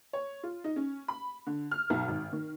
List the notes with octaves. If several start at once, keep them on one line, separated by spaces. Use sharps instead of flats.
C#5
F4
D#4
C#4
B5
D3
F6
B1
G#1
D#3